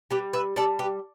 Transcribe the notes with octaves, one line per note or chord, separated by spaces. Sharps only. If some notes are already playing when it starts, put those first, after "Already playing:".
G3 G4 B4
B4 E5
G3 A4 D5
G4 B4